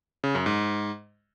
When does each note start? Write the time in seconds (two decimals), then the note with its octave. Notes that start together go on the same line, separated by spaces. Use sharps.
0.24 C#3
0.35 F#2
0.46 G#2